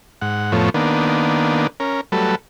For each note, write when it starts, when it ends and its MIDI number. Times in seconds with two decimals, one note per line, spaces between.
0.22 0.52 44
0.22 0.52 78
0.52 0.70 41
0.52 0.70 45
0.52 0.70 53
0.52 0.70 57
0.52 0.70 59
0.52 0.70 73
0.74 1.67 51
0.74 1.67 58
0.74 1.67 59
0.74 1.67 62
1.80 2.01 61
1.80 2.01 70
2.12 2.35 54
2.12 2.35 55
2.12 2.35 57
2.12 2.35 69
2.12 2.35 71